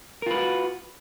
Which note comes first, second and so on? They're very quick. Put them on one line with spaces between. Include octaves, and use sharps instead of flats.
A#4 F4 B4 F#4